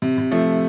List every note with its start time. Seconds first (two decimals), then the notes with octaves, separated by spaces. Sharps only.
0.02 C3
0.18 C3
0.31 F3 A3